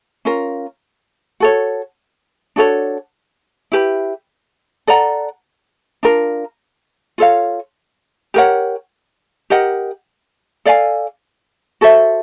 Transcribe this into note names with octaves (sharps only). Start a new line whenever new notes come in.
C#4 F4 A#4
F#4 A4 C#5
D4 F#4 A4 C#5
E4 G4 B4
A4 D5 F#5 A#5
D4 F4 A#4
F4 A4 C#5 F5
G4 A#4 C#5 F#5
G4 A#4 D#5 F#5
A4 D5 F5 G#5
F#4 A4 C5 E5